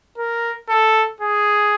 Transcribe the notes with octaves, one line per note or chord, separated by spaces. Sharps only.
A#4
A4
G#4